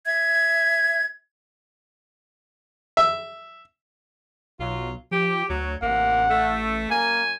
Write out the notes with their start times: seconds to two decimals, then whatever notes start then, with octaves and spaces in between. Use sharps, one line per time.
0.05 E5 G#6
2.97 E5
4.59 B1 F#3 F4
5.11 F3 G4
5.50 D2 F#3
5.82 A1 C3 A#3 F#5
6.29 A3
6.90 F#2 A#3 G#5